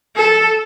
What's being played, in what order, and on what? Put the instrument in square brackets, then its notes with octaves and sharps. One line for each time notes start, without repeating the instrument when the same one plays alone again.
[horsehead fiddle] A4